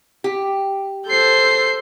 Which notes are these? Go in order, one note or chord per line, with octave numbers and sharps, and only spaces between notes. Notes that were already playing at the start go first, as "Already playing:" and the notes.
G4
A4 C5 G6 C7